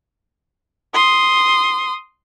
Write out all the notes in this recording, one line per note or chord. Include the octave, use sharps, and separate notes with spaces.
C6 D#6